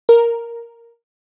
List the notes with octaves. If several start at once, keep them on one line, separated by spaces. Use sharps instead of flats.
A#4